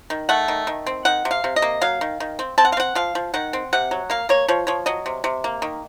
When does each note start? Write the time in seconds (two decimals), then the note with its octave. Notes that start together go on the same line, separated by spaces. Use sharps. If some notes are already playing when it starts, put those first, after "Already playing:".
0.10 D#3
0.29 A3 F#5
0.48 D#3
0.67 D#3
0.86 C4
1.05 D#3 F#5
1.25 C3
1.31 F5
1.44 C3
1.56 D#5
1.62 A#3
1.81 F#3 F5
2.01 D#3
2.20 D#3
2.39 C4
2.58 C4 A5
2.65 F#5
2.72 F5
2.77 C4 F#5
2.95 F3 F5
3.15 F3
3.34 D#3 F#5
3.53 C4
3.73 C3 F#5
3.91 F#3
4.10 A#3 F5
4.29 A#3 C#5
4.48 F3 C#5
4.67 F3 C#5
4.86 F#3 D#5
5.06 C3
5.24 C3
5.44 A#3
5.62 D#3